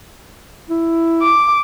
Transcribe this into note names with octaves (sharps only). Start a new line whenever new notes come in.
E4
D6